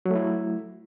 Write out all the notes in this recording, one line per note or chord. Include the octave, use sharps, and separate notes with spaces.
F#3 A3 E4